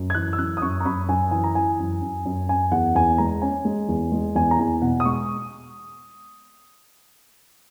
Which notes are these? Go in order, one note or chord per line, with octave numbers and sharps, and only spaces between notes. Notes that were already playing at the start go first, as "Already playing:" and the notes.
Already playing: F#2
G#6
E3 F#6
E6
F#2 F#6
D#6
F#2 C#6
A#5
F#2 B5
F#2 G#5
E3 G#5
A#5
E3 G#5
F#2
F#2
F#2
C#4 G#5
E2 F#5
E2 G#5
G#3 A#5
C#4 G#5
G#3
E2
G#3
E2 G#5
A#5
E2 G#5
B2 F#5
D#6
G#3 C#6